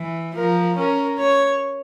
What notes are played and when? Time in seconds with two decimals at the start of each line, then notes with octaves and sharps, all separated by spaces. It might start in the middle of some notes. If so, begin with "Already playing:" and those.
Already playing: E3
0.34 F3 A#4
0.77 C#4 A#4
1.19 C#5